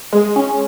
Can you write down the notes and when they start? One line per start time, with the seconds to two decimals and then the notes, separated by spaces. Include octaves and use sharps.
0.13 G#3
0.36 C#4